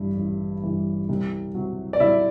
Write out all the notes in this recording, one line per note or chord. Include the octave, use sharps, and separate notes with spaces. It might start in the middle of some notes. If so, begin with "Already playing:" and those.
Already playing: A1 G2 E3 E4
A1
G2 E3
C2
C3 F#3
D5
C2 E4 E5